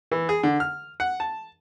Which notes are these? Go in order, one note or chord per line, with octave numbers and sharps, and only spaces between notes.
E3
G#4
D3
F6
F#5
A5